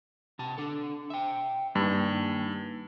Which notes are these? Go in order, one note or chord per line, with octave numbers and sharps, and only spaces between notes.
C3 A5
D4 A4
E5 G5
G2 A#3 D#4